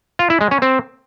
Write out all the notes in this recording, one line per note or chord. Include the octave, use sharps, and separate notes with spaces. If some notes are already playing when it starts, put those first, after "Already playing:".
F4
E4
G#3
C#4
C4